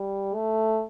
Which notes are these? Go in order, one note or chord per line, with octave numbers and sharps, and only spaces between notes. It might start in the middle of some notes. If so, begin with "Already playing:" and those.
Already playing: G3
A3